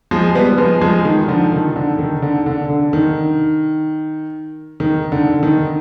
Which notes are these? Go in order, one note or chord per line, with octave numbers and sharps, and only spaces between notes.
F3 G#3
G3 B3
F3 G#3
F3 G#3
D#3
D3 F3
D#3
D3
D#3
D3
D3
D3
D#3
D#3
D3
D#3